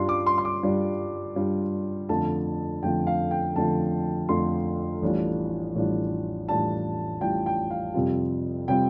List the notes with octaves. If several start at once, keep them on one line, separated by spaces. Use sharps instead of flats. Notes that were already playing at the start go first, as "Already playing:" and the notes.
Already playing: G2 G3 D4 F4 C6
D6
C6
C6
D6
G2 G3 D4 F4
G2 G3 D4 F4
F2 D3 A3 F4 A5
F2 D3 A3 F4 G5
F5
G5
F2 D3 A3 F4 A5
F2 D3 A3 F4 C6
A1 A2 G3 D4 F4
A1 A2 G3 D4 F4
A1 A2 G3 D4 F4 A5
A1 A2 G3 D4 F4 G5
G5
F5
F2 C3 G3 C4 F4
C3 G3 C4 F4 G5